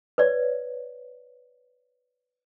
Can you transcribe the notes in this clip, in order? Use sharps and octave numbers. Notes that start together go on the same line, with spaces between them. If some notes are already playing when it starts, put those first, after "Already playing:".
B4 C#5 D5